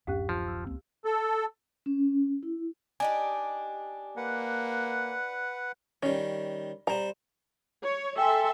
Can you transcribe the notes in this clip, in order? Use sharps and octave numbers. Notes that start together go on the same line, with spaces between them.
D1 F#2 C#4 D4 G4 F5
F3
E6
C#2 A#3 C4
A4
C#4
E4
D4 D#4 G4 G#5
A#3 B4 F#5
D#3 G3 C#4
G3 C4 A#5
C#5
A4 E5 G5 G#5 C6